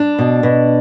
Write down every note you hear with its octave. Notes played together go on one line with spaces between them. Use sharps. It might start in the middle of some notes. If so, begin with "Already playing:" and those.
Already playing: D4
B2
B2